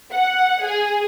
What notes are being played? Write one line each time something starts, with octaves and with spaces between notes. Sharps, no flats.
F#5
G#4